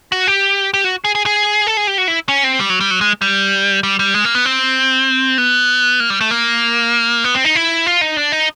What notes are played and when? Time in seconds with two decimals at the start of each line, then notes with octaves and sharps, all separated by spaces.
0.12 F#4
0.28 G4
0.74 G4
0.84 F#4
1.05 G#4
1.15 G#4
1.26 G#4
1.67 A4
1.77 G#4
1.87 G4
1.98 F#4
2.08 E4
2.29 C#4
2.44 C4
2.60 G3
2.70 F#3
2.80 G3
2.91 F#3
3.01 G#3
3.22 G3
3.83 G3
3.99 G3
4.14 G#3
4.25 A#3
4.35 B3
4.45 C4
5.38 B3
6.00 A#3
6.10 G3
6.21 A3
6.31 A#3
7.24 B3
7.35 C4
7.45 D#4
7.55 E4
7.86 F4
8.01 D#4
8.17 D4
8.32 D#4